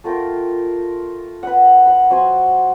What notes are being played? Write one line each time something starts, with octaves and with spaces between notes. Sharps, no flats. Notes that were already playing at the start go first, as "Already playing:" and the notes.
A3 F4 A#4 G5
B4 D#5 F#5
F#5 B5
F#3 C5 G#5 C6